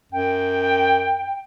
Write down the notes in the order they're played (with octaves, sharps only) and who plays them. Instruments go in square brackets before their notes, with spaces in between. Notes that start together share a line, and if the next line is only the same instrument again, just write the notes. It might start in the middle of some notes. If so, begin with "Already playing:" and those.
[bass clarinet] F#2 [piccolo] G5